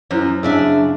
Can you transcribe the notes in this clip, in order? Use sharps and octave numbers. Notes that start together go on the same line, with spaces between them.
F#2 E4 C5 C#5
C#3 D4 E5 E6